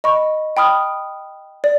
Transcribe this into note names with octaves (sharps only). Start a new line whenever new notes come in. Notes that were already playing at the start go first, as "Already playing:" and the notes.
D#5 B5 C#6
G5 B5 D#6 F6
D5